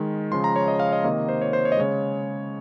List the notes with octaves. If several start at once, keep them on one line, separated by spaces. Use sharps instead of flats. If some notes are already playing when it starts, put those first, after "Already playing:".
Already playing: D#3 G#3
C#3 F3 G#3 C6
A#5
C#5
D#5
F5
D#5
C3 D#3 A#3 D#5
C5
C#5
C5
C#5
D#5
C#3 G#3 C#5